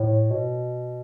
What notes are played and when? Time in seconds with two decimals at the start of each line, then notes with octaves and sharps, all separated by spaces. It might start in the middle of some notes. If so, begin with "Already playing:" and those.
Already playing: A2
0.30 B2